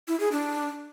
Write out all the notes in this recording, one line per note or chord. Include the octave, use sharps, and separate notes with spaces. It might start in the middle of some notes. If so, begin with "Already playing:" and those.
E4
G#4
D4